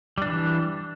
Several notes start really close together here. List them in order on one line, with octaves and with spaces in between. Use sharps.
G3 D4 E3